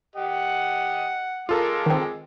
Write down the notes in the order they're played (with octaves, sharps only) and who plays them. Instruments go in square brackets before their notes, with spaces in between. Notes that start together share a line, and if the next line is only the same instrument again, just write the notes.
[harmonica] G4 D#5 [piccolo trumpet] F#5
[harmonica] G#3 D6 [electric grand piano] F4 A4 A#4
[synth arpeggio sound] D#3 C4